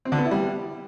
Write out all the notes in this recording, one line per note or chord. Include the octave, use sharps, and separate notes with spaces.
C4
D3
B3
E4
G3